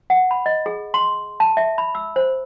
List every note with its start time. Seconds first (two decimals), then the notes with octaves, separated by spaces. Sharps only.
0.10 F#5
0.31 B5
0.46 D#5
0.66 G#4
0.94 C6
1.40 A5
1.57 E5
1.78 B5
1.95 E6
2.16 C5